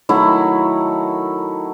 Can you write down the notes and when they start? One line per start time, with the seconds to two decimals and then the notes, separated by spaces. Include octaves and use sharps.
0.09 D#3 F#3 A3 E4